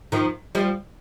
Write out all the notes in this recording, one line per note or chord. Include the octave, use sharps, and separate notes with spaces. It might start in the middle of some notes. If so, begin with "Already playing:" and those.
D#3 F3
F3 G3